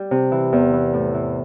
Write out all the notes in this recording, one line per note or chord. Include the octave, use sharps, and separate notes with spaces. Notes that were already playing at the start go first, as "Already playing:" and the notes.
Already playing: G3
C3
E3
E2
E3
A2
E3